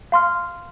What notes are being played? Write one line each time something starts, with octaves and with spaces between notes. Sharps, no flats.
F5 C6 F6